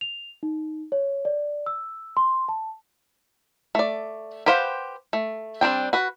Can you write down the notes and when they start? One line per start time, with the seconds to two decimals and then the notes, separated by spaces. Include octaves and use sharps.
0.01 F7
0.43 D#4
0.92 C#5
1.25 D5
1.66 E6
2.17 C6
2.49 A5
3.75 A3 D5
4.46 G4 B4 C5 F5 F#5
5.13 A3
5.61 G3 C4 D4 G5
5.93 F#4 B4